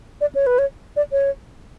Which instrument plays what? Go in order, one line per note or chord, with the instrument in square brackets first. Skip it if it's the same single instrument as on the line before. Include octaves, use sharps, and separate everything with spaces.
[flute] D5
C#5
B4
C#5
D5
C#5